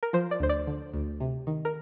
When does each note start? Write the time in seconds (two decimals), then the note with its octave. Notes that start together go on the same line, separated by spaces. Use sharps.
0.03 A#4
0.13 F3 C5
0.31 D5
0.40 D2 C5
0.49 D5
0.67 D3
0.93 D2
1.20 C3
1.47 D#3
1.65 A#4